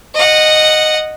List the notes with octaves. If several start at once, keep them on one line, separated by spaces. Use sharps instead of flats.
D#5 F#5